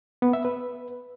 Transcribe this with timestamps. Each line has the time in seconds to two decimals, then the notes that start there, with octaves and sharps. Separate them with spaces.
0.22 B3
0.33 E5
0.45 B4